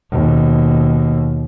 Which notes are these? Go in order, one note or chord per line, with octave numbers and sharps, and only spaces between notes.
D#2 B2